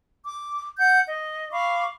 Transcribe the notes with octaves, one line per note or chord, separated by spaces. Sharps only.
D6
F#5 G6
D#5
F5 B5 C#6 D6